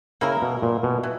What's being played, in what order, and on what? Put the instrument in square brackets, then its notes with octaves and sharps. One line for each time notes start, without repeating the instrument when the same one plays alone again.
[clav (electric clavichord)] C#3 [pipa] A#3 E4 A#4
[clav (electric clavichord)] B2
A#2
B2
[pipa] E3